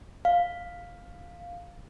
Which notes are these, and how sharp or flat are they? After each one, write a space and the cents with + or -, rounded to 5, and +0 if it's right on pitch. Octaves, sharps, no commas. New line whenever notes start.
F5 +5